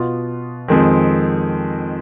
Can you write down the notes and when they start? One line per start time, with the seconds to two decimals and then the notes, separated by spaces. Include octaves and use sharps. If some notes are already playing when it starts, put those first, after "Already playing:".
Already playing: B2 B3 F4
0.68 F2 D#3 G#3 C4